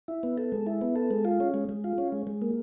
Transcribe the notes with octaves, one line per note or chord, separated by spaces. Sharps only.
E4
B3
A4
G#3
E4
B3
A4
G#3
F4
C#4
G#3
G#3
F4
C#4
G#3
G#3
A#3